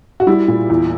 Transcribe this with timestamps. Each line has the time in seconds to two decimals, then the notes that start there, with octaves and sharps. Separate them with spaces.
0.20 F#4
0.27 G3 E4
0.48 A#2
0.70 E2